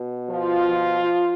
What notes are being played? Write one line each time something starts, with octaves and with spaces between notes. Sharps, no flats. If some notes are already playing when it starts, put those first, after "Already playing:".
Already playing: B2
F3 F4